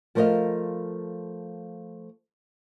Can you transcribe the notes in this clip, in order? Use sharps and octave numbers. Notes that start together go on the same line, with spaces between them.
F3 A3 A#4 C5 D#5 F5